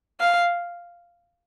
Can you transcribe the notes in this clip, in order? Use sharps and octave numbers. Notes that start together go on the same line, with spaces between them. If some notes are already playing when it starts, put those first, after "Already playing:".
F5